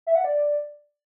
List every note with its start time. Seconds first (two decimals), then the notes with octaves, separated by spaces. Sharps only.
0.07 E5
0.15 F#5
0.24 D5